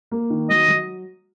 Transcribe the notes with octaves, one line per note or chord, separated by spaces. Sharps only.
A#3
D#3
F#3 D#5
F#3